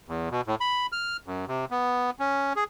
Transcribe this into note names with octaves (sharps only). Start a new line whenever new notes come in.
E2
B2
A2
B5
F6
F#2
C3
B3
C#4
G#4